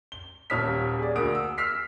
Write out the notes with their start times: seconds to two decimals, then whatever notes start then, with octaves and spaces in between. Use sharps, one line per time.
0.12 G7
0.50 D#1 D#2 C#5 D#6 F6 B6
0.99 G#4 D5
1.15 D2 A#3 F#4 D#6 D7
1.35 E6
1.58 E6 F6 B6 C7